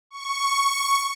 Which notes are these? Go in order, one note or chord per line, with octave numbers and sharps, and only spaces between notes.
C#6